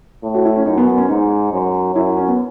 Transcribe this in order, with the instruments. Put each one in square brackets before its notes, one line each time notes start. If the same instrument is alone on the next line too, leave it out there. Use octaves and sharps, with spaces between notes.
[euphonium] A2
[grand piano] F#4
E4
C#4
[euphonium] F#2 [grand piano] D#4
[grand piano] B3
B3
C#4
[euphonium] G#2 [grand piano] D#4
[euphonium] F#2
[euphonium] F#2 [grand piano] E4
[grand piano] C#4
B3